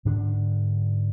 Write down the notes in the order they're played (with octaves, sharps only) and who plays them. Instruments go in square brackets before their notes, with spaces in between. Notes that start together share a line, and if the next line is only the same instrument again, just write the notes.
[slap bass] G#2 D3 D4